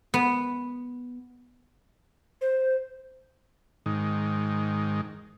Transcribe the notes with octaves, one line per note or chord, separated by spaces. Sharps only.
B3
C5
G#2 D#3